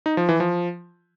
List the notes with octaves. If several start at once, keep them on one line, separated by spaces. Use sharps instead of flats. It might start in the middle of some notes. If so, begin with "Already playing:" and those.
D#4
F3
E3
F3